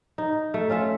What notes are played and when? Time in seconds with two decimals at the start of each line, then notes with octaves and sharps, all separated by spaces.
0.18 D#4
0.54 A3
0.69 C#4 F4 E5 F5